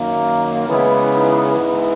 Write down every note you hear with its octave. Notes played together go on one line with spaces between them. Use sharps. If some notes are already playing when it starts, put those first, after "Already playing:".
Already playing: F#2 D#3 A#3
C#3 E3 G#3 B3 E4
D#4
G#2 E3 B3